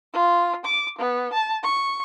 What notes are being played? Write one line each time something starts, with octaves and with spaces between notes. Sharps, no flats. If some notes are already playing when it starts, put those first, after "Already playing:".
F4
D6
B3
A5
C#6